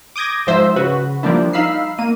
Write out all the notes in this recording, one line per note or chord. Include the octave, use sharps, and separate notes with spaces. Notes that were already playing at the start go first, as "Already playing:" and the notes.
D6 D#6 G6 G#6 A#6
G#2 F3 C5 E5 E6
C#3 F#4 B4
F3 G3 A#3 D4 E4
D#4 F5 B5 E6 C7
A#3 D#7